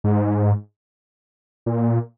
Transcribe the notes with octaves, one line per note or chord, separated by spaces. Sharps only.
G#2
A#2